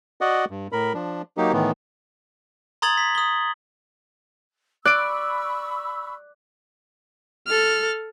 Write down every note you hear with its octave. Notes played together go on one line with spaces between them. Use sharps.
F#4 D5 D#5 F#5
G2
A2 A#4 B5
F3 D4
F#3 A#3 D#4 G4
A2 D#3 E3 B3
A#5 C6 D#6 G#6 A6 F#7
B6
D#6 G7
D5 B5 C#6 E6 F#6 D7
A4 F6